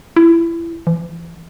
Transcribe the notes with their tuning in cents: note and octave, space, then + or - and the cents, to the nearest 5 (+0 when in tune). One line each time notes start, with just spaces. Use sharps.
E4 +25
E3 +40